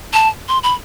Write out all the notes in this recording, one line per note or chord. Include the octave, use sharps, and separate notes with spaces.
A5
C6
B5